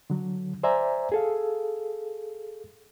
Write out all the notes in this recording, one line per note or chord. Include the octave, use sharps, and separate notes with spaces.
D3 F#3
C5 D5 E5 G#5 A#5
G#4 A4 F5